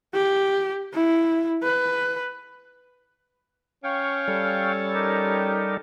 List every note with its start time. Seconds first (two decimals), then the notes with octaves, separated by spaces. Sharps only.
0.14 G4
0.94 E4
1.63 B4
3.84 C#4 F5 G5 C#6
4.28 G3 A4
4.94 D#4 G4 A#4